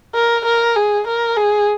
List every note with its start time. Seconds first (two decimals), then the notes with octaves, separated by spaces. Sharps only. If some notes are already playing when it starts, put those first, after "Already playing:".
0.15 A#4
0.45 A#4
0.76 G#4
1.07 A#4
1.37 G#4